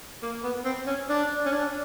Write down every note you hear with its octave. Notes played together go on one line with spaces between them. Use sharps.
A#3
B3
C4
C#4
D4
C#4
D4